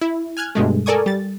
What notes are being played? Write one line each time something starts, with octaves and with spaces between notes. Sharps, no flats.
E4
G#5 F6 F#6 G#6
G2 B2 G#3 A3
A4 A#4 D5 G#5 C#6 D#6
G3 A6